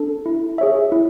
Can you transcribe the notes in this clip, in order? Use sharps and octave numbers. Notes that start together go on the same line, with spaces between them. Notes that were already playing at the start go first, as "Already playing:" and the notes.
Already playing: D4 A4
E4
G#4 C#5 E5
E4